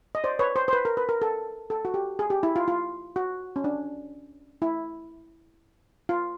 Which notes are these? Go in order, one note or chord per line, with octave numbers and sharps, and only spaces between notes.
D#5
C5 D5
B4 C#5
C5
C5
B4
A#4
B4
A#4
A4
A4
F#4
G4
G#4
G4
E4
F4
F4
F#4
C#4
D4
E4
F4